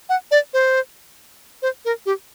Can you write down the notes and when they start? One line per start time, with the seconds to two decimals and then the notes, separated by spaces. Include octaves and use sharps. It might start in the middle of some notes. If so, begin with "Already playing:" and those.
0.09 F#5
0.31 D5
0.54 C5
1.62 C5
1.85 A#4
2.06 G4